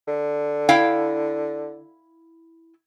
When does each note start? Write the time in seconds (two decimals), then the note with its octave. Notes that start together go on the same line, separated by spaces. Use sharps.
0.08 D3
0.69 E4 F5 G5